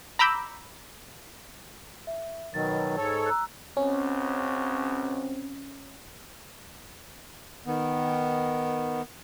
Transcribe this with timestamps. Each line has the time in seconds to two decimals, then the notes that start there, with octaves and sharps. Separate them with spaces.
0.19 A#5 B5 D6 E6 G6
2.07 E5
2.54 B2 D#3 F#3 A6
2.97 G#2 A4 C#5
3.26 A#5 E6 F#6
3.77 C#2 C#3 C4 C#4 F#4
7.67 D#3 B3